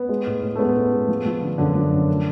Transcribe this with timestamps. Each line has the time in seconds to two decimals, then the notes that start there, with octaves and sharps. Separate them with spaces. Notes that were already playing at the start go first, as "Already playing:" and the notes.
Already playing: B3
0.09 G#3
0.27 A2
0.42 A2
0.55 A3
0.59 G#3 B3
0.76 A2
0.92 G#3
1.08 F3
1.26 F3
1.43 D3
1.58 F#2 D3 D4
1.75 F3
1.91 F#2
2.08 A3